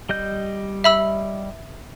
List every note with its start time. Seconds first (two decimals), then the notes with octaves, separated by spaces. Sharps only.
0.09 G3 D#5 G6
0.84 E5 B5 E6